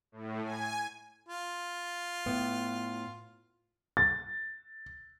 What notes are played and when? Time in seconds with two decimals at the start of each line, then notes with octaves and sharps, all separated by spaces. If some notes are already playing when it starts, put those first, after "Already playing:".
0.12 A2
0.44 G#5
1.27 F4
2.26 A2 B3
3.97 A6